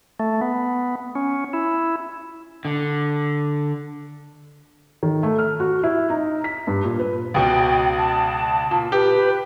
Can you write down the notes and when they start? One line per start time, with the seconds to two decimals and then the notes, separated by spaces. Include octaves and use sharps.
0.20 A3
0.41 B3
1.15 C#4
1.53 E4
2.65 D3
5.03 D#3
5.23 A3
5.39 F6
5.60 F#4
5.84 E4
6.10 D#4
6.44 B6
6.67 G2
6.85 A#2
6.99 B4
7.34 C#2 B2 G5
7.97 A5
8.71 A#2
8.92 G4 B4